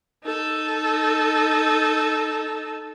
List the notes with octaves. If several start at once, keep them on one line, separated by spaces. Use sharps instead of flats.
D#4 A4